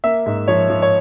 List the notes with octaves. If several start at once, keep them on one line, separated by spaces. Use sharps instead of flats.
A#3 E5
G#2
F3 C#5
F3
C#5